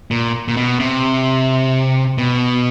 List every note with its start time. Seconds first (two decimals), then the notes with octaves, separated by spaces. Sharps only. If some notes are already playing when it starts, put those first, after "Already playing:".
0.11 A#2
0.48 A#2
0.57 B2
0.80 C3
2.18 B2